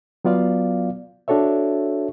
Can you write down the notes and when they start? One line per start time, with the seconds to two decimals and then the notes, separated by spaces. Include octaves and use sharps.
0.25 F#3 B3 F4 D5 F5
1.28 D4 F#4 A4 C#5 E5